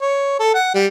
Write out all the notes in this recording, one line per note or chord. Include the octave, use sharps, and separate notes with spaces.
C#5
A4
F#5
G3